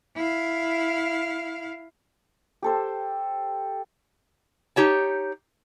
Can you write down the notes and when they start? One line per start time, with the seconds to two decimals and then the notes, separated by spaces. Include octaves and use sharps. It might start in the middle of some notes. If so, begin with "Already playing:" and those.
0.16 E4 F5
2.62 G4 A4 C5
4.76 D#4 G4 C#5 A5